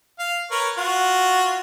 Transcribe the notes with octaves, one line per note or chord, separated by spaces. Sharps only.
F5
A#4 B4 C#5
F4 F#4